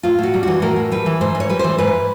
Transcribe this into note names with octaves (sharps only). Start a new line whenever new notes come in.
A2 F4
A2 F#4
G3
E3 F#4
A2 A#4
A2
G3 B4
E3
G#2 C5
G#2
C#5
G3 B4
E3 C5
G#2 B4